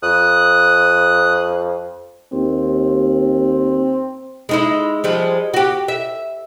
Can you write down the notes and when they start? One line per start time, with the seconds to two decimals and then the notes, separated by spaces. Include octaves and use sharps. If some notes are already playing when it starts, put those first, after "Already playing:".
0.03 F2 D#6 F#6
2.33 D#2 C4
4.49 G#3 D#4 E4
5.04 F3 G3 G#3
5.54 F#4 G4
5.88 E5